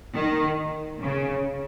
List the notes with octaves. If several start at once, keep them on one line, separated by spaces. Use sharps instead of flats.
D#3
C#3